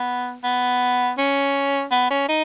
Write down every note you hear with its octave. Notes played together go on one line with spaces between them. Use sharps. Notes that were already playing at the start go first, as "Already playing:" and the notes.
Already playing: B3
B3
C#4
B3
C#4
D#4